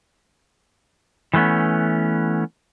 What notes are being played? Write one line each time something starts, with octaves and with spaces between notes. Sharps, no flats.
E3 F#3 A3 B3 C#4